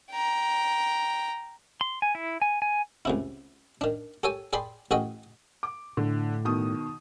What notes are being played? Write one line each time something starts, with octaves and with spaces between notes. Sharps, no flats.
G5 A#5
C6
G#5
E4
G#5
G#5
C#2 C3 E4
D#3 D4
G4 A4 C#5 G5 G#5
G#4 D5 G5 B5 C6
A1 F#4 G#4 D#5 G5
D6
A2 D3
B2 D#3 D#6